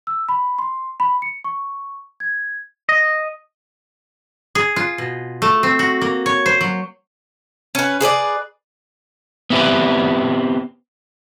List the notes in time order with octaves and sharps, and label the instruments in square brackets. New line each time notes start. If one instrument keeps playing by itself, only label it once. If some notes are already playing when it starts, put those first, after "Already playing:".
[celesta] E6
B5
C6
B5
C#7
C#6
G#6
[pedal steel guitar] D#5
[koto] G#4
F4
B2
A3
C4
F#4
A#3
C#5
C5
F#3
[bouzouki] C#4 B4
G#4 B4 C5 D5
[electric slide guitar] B3 C4 E4 G4 B4